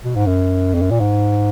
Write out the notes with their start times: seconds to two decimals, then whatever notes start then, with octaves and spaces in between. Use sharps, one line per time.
0.04 B2
0.15 G#2
0.27 F#2
0.74 F2
0.82 F#2
0.91 A#2
1.00 G#2